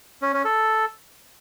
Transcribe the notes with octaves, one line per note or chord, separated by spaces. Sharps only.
C#4
C#4
A4